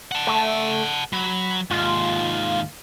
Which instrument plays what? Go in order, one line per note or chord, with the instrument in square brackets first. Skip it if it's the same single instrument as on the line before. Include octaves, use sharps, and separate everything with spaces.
[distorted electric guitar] F#5 A5
[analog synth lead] A3
[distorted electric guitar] F#3 [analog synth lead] B5
[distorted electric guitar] D#2 G#2 [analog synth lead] F4